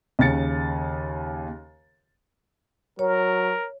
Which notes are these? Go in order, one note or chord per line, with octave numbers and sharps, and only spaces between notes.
D#2 C#3 A6 C#7
F#3 A#4 C#5